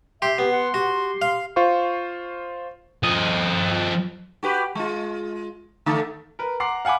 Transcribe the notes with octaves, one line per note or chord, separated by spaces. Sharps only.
G4 E5 C6
B3 G4
F#5
F#4 G4
F5
F4 C5 F5 C#6
F3 D#5
F#4 G4 B4
G#3 F4
D3 A3 A4
A#4 B4
F#5 A#5 C6 D6 C7
F5 F#5 G#5 B5 D6